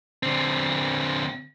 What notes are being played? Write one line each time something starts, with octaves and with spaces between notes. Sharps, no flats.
D3 C4